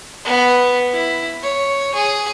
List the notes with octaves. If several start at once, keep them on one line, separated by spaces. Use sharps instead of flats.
B3
E4
C#5
G#4